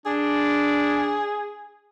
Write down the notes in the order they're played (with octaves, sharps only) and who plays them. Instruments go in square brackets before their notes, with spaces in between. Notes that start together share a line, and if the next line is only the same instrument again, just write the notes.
[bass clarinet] D4 [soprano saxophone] G#4